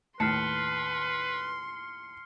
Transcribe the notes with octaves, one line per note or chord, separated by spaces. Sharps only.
D#2 A2 B4 A5 C6 F6 C7 C#7